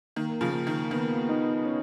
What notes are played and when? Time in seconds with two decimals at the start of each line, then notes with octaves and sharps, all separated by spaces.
0.16 D#3 A#3
0.41 C#3 F3
0.54 A#3
0.67 D#3
0.91 D#3 B3
1.29 D#4
1.65 C#4